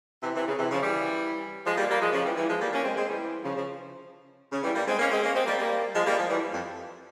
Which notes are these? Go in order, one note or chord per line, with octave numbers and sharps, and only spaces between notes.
C3 E3
C3 E3
C#3
C3 E3
C#3 F3
E3 G3
F3 G#3
G3 A#3
G3 A#3
F3 G#3
C#3 F3
E3 G3
E3 G3
F3 G#3
G3 A#3
A#3 C#4
G#3 C4
G#3 C4
E3 G3
C#3 F3
C#3 F3
C#3
E3 G3
G3 A#3
G#3 C4
A#3 C#4
G#3 C4
A#3 C#4
G#3 C4
G3 A#3
G3 A#3
F3 G#3
G3 A#3
F3 G#3
E3 G3
F2